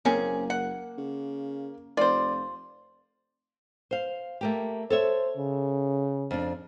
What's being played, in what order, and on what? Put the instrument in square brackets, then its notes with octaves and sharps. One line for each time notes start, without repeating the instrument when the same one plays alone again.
[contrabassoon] F#1 [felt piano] A#3 [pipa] C4 C#4 G#4
[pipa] F#5
[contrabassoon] C#3
[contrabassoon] F1 [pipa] F4 C5 [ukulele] D5
[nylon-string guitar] C5 F5
A3 A#3 G4
[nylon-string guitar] A4 C#5 E5 [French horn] C5
[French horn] C#3
[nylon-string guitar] F2 D4